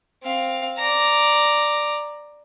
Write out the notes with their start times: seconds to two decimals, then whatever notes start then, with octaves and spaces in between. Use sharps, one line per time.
0.24 C4 F5
0.78 D5 A#5